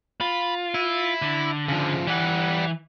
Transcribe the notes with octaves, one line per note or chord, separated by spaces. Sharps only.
F4 B5
E4
D3
C#3 F3
E3 G3 F#5